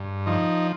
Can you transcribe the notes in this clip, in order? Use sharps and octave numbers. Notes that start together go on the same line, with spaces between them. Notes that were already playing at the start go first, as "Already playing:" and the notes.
Already playing: G2
F3 D#4